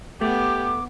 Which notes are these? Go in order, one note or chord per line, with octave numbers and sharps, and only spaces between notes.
A3 B3 G4 D6